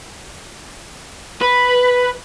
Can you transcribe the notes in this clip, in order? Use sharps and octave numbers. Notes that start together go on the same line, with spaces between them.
B4